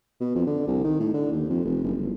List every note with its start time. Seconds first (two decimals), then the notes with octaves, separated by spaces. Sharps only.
0.20 B2
0.35 F2
0.47 D3
0.67 C2
0.84 D#3
1.00 A2
1.14 D3
1.32 D#2
1.50 F2
1.65 F1
1.84 F#1
1.97 G1